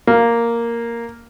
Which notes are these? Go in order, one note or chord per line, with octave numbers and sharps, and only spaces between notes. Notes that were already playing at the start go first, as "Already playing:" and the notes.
A#3